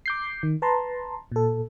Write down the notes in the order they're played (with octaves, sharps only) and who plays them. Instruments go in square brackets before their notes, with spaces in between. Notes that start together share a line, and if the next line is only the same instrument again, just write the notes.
[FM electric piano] D6 G6 C7
D#3
B4 A5 A#5 C6
A#2 A4